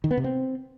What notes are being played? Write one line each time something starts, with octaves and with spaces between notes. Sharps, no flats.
D#3
B3
C3
C4